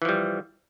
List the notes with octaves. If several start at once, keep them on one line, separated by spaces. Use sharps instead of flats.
E3 F3 G3